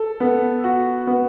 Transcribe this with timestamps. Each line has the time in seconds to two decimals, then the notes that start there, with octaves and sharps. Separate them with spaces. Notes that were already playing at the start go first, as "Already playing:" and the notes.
Already playing: A4
0.20 B3
0.64 F#4
1.07 B3